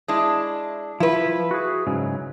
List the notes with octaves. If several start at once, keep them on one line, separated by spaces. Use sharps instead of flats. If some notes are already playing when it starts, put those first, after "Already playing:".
G#3 D4 E4
F3 E4 B4
F#4 G#4
G#2 C#3 F#3